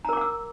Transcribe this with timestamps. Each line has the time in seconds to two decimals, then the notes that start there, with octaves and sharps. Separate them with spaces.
0.05 A#5
0.09 A#4
0.13 D6
0.17 F#5
0.21 E6